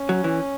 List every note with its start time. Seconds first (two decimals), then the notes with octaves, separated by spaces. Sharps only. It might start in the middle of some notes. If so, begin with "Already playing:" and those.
Already playing: C#4
0.09 F#3
0.24 E3